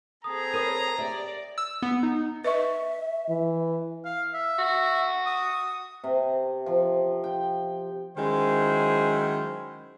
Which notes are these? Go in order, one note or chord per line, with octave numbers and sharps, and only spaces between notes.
C4 G#4 A4 A#5 D#6
A#4 B4 C#5 D#6 D#7
G4 D5 E5
E6
B3
D#4
B4 D#5 E5 C#6
E3
F5
E5
F#4
D#6
C3
F3
G5
D#3 F#3 G#3 C#4 E4 C5